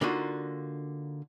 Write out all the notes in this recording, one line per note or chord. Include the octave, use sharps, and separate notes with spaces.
D3 A#3 D4 D#4 F4 F#4